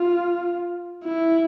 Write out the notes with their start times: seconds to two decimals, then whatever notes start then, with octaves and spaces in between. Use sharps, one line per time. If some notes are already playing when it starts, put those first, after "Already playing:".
Already playing: F4
1.04 E4